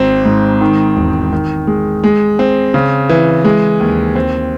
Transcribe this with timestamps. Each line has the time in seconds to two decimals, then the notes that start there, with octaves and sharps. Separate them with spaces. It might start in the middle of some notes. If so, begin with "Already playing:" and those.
Already playing: G#1 C4
0.25 G#2
0.61 D#3
0.97 E1
1.33 D#3
1.67 G#3
2.04 G#3
2.39 C4
2.74 C#3
3.09 E3
3.45 G#3
3.80 D#2
4.16 C4